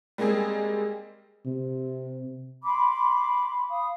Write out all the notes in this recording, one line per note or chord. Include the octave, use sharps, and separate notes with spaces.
G3 G#3 A#3 C4 G#4
C3
B5 C6 D6
F5 B5 D#6